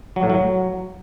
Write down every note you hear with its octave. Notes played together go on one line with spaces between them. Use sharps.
F#3
A2
F#3